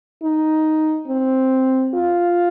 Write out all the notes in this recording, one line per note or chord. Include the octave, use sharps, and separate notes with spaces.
D#4
C4
F4